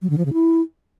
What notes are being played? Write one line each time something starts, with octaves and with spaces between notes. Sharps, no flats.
F#3
D3
F3
C#3
E4